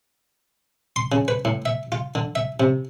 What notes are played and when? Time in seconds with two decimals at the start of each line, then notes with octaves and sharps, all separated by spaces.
0.96 C6
1.12 C#3
1.28 B4
1.45 A2
1.66 E5
1.92 F4
2.15 D3
2.35 E5
2.60 C3